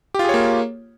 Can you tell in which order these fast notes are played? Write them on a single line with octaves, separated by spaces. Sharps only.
G4 F4 G#4 C#5 A#3